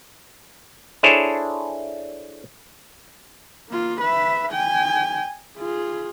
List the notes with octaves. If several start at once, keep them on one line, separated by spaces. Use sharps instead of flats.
D4 E4 G#4 A4 C5 C#5
A#3 F4
B4 E5
G5 G#5
F4 G#4